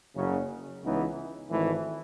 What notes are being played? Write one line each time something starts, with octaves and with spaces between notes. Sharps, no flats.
F#1 F#2 C#3 F#3 C#4
C#2 C#3 E3 B3 D#4
G#1 G#2 E3 A3 E4